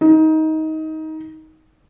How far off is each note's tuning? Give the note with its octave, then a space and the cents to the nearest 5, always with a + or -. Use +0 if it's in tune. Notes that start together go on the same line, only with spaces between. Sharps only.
D#4 +20